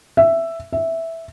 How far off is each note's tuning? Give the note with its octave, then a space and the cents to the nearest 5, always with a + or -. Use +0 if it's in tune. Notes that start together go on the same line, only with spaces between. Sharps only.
E5 +10
E5 -5